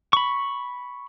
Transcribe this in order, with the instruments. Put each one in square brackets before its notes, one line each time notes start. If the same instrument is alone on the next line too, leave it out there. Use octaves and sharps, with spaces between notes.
[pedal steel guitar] B5 C#6